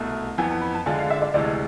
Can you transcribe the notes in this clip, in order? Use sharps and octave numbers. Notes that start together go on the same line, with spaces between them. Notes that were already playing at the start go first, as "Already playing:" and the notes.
Already playing: C2 B2 A3
F2 E3 B3 G#5
A5
B5
A5
D3 G#3 D4 F4 G#5
F5
E5
D5
D2 C3 E3 G#3 D5